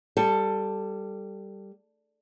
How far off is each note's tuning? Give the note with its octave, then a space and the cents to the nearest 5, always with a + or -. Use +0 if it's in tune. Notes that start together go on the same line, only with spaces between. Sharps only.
G3 +0 A4 +10